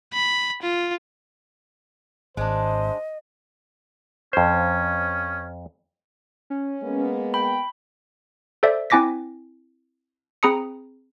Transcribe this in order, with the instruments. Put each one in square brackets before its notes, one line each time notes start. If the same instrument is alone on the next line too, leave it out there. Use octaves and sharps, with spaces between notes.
[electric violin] B5
F4
[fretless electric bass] G#1 [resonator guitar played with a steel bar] G#3 D4 [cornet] C5 [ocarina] D#5
[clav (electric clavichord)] F2 C5 [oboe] C#4
[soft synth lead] C#4
[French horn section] G#3 A#3 B3
[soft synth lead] G5 [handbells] B5
[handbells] A4 C5 D5 E5
C4 E4 G#5 D6 A#6 B6
C4 G#4 A#5 B5 D#6 C#7